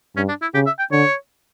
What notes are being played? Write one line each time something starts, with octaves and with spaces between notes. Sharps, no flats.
G2 C#4
D4
E4
C#3 G4
E5
G5
D3 C#5